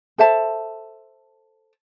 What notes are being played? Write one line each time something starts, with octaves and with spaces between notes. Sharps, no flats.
A4 C5 E5 A5